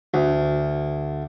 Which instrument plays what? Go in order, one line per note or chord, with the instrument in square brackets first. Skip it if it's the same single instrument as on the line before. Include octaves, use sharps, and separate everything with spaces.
[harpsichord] D2